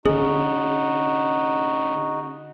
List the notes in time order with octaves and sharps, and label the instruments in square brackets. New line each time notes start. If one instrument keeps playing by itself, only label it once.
[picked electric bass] D3 C#4 [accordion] D#4 F#4 [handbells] G#4